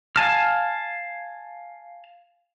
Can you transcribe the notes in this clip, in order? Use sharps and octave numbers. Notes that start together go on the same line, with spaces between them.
F5 G#5 A5 F6